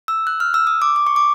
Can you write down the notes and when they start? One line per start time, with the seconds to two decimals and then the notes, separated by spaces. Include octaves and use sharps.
0.08 E6
0.27 F#6
0.40 F6
0.54 E6
0.67 D#6
0.82 D6
0.96 D6
1.07 C#6
1.16 D6